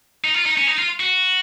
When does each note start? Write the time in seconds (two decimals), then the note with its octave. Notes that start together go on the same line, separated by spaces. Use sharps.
0.24 D#4
0.34 F4
0.46 D#4
0.57 C#4
0.67 D#4
0.78 F4
1.00 F#4